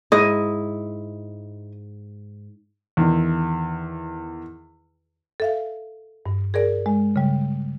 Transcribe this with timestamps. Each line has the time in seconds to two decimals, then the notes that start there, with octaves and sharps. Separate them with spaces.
0.12 G#2 E4 D#5
2.97 E2 D#3
5.40 A4 E5 F5
6.26 G2
6.54 G#4 A#4 D5
6.86 G#3
7.16 C#3 G3